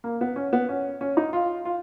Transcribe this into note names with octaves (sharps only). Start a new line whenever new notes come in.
A#3
B3
C#4
B3
C#4
C#4
D#4
F4
F4